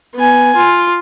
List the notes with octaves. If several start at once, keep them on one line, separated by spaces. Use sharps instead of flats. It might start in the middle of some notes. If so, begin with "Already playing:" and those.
B3 G#5
F4